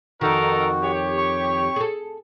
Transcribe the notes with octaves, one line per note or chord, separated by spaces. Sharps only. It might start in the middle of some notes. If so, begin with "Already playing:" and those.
F2 D#3 D#4 F#4 A4 A#4
G4 C#5
C#6
G#4 A4